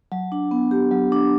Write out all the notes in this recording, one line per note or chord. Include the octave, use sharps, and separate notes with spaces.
F#3
D4
B3
G4
F#3
D4